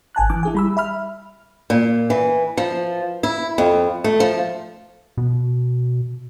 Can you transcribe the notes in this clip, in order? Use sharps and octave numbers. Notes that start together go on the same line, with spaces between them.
G#1 G#5 A5 F#6
E3 D6
E4 G#4 G#5
G3 B5 E6
E5 B5 F6
A#2
E3
F3
E4
F2
A3
F3
B2